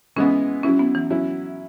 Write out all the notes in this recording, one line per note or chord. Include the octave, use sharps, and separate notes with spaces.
E3 G#3 B3 C#4
F#3 C#4 E4
B3
E3
F#3 C#4 E4